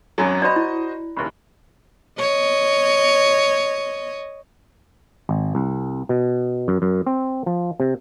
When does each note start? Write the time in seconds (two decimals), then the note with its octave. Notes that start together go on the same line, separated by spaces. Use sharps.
0.18 G#1 F#2 F#3
0.42 F#4 C5 D5 D#5 B5
0.56 E4
1.16 F#1 D#2
2.19 C#5 D#5
5.29 G#1
5.55 C2
6.09 B2
6.68 F#2
6.82 F#2
7.06 C4
7.46 F3
7.80 C3